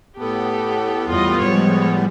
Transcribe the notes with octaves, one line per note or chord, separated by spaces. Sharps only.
A2 B3 G4 A4
E2 G3 F4 D#5
F3 G#3 C#5